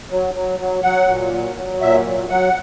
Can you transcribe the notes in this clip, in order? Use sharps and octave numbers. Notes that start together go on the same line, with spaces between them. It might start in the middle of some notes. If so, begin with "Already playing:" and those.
F#3
F#3
F#3
F#3 F#5
A#2
F#3
F#3
A#2 E5
F#3
F#3 F#5